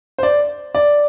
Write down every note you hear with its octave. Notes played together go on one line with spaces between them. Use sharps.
C5
D5
D5